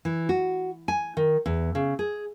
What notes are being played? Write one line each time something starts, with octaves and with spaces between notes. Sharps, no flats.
E3
F#4
G#5
D#3
E2
C#3
G#4